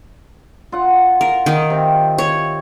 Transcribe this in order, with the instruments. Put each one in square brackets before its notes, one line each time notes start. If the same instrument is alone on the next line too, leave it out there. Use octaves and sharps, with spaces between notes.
[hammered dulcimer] F4 F#5
[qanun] A#4
D#3
[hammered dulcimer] C3
[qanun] C#5